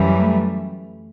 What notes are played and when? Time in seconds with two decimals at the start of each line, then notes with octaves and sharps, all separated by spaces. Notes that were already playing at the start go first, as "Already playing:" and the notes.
Already playing: F#2 E3 G3
0.18 A3